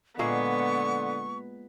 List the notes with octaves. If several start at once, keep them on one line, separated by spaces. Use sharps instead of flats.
A#2 D3 G#3 A#3 B3 C#6